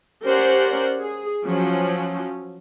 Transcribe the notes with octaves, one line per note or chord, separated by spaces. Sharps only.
C#4 G4 A#4 C5 D5 F#5
G#4
F3 F#3 C#4